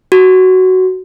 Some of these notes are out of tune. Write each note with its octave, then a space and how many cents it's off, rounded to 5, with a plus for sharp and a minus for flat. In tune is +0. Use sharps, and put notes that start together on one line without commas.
F#4 +10